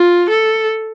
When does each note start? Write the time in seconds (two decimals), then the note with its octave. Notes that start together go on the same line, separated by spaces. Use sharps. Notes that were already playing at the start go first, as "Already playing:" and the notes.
Already playing: F4
0.30 A4